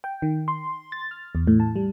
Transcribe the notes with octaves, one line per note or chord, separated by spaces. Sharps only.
G5
D#3
C6
A6
F6
E2
A2
A5
G3